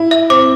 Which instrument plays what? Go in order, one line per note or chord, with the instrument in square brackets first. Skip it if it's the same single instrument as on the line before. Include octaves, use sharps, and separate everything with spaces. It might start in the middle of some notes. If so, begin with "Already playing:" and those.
Already playing: [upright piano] E4
[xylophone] E5
[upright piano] C4 [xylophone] D6